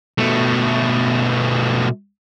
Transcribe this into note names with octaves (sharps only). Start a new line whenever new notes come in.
B2 A3